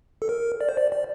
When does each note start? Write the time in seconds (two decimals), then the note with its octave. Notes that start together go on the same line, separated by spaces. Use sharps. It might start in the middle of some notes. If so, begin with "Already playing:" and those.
0.22 A4
0.29 A#4
0.61 D5
0.69 C5
0.77 D5
0.92 D5